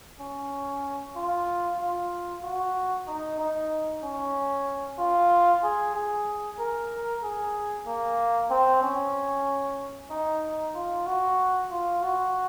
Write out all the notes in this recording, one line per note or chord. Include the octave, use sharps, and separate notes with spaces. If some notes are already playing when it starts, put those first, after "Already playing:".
C#4
F4
F4
F#4
D#4
D#4
C#4
F4
G#4
G#4
A#4
G#4
A#3
C4
C#4
D#4
F4
F#4
F4
F#4